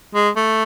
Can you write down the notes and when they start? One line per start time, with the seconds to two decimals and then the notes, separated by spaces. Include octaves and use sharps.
0.15 G#3
0.36 A3